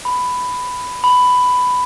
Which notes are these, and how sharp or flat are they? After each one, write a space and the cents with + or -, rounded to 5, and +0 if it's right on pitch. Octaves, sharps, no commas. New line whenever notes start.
B5 +10
B5 +10